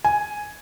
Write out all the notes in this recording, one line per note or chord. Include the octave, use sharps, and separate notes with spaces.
G#5